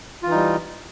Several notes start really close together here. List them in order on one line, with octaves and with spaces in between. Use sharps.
F4 E3 D#4 G3